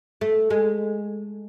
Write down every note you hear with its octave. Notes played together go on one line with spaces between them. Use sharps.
A3
G#3